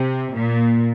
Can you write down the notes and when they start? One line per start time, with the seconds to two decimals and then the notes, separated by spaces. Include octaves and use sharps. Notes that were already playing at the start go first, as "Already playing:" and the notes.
Already playing: C3
0.35 A#2